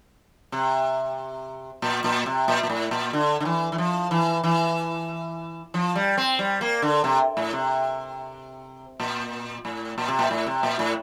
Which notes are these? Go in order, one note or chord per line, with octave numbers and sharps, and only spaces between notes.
C3
A#2
A#2
C3
A#2
A#2
A2
A#2
D3
D3
E3
E3
F3
E3
E3
F3
G3
C4
G3
A#3
D3
C3
A2
C3
A#2
A2
A#2
C3
A#2
A2
C3
A#2
A2